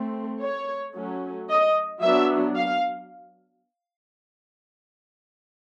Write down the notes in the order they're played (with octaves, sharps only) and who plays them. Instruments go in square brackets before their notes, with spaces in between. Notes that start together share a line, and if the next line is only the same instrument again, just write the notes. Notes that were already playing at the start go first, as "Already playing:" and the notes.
Already playing: [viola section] A3 C4
C#5
F#3 A3 C#4
D#5
F#3 B3 D4 E5
F5